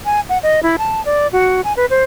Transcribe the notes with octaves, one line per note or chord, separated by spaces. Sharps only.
G#5
F#5
D#5
E4
A5
D5
F#4
G#5
B4
C5